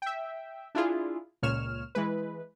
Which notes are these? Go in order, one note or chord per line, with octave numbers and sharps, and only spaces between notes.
E5 G5
D4 E4 F4 G#4
C#2 A#2 C#5 F6 E7
E3 G#3 B4